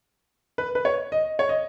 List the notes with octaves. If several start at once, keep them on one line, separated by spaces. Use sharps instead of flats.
B4
B4
C#5
D#5
C#5
D#5